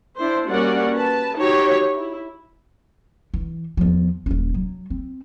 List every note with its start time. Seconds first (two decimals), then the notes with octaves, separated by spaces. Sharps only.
0.17 D4 E4 C5
0.47 G3 A#3 C#4 F#4 D5 F#5
0.93 B4 A5
1.35 D#4 F#4 G4 C#5
1.93 E4
3.34 E3
3.77 E2 F3
4.26 D#1 C#4
4.54 F#3
4.90 C4